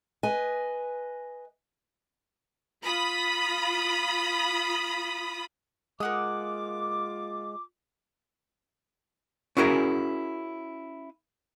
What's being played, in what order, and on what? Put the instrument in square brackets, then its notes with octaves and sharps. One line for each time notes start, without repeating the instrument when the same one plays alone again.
[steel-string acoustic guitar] B4 D#5 G#5
[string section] F4 B5 D#6
[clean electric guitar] G#3 [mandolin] A#3 F#5 D#6 [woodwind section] F4 D6
[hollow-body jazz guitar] C#4 E4 F#4 G#4 A#4